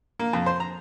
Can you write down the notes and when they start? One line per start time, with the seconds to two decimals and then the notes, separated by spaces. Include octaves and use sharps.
0.19 A#3
0.33 F2
0.46 C5
0.60 A#5